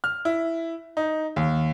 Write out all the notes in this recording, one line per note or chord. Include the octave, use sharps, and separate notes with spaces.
F6
E4
D#4
D#2